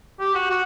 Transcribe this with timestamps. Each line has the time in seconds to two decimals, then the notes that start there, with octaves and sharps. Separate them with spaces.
0.20 G4
0.35 F#4
0.50 F#4